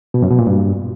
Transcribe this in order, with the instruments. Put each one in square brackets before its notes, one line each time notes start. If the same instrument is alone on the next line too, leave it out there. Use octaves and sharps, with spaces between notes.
[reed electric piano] B2
F#2
B2
A#2
G2